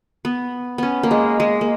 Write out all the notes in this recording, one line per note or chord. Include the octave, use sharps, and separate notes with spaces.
B3
B3 C#4
A#3
G#3
G#3
A#3